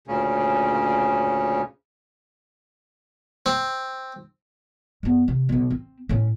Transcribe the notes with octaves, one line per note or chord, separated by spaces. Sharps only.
D2 A#2 C#3 C#4
C4
F#2 B3
C3
B1 C#3
C4
A2 C#4